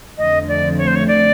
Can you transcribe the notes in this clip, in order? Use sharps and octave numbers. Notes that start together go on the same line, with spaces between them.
F2 D3 F3 A3 C4 D#5
D5
C#5
C5
C#5
D5